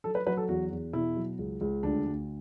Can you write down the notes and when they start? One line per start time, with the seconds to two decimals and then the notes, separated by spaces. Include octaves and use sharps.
0.04 F#3 A4
0.15 B4
0.27 F#3 B4
0.37 A4
0.48 E2 F#4
0.71 E2
0.93 B2 E4
1.16 F#3
1.39 C#2
1.61 C#2
1.83 D2 D4
2.05 D2